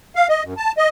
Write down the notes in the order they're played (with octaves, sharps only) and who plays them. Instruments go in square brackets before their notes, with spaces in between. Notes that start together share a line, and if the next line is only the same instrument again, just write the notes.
[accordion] F5
D#5
F#2
A5
D#5